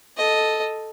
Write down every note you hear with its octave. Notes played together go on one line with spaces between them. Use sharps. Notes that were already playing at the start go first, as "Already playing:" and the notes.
A4 D#5